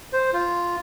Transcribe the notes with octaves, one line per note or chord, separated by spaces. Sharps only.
C5
F4